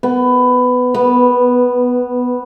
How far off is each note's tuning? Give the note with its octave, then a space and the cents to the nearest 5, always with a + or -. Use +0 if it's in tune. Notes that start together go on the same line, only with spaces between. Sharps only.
B3 +15
B3 -5